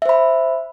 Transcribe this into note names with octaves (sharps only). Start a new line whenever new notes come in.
C5 E5 B5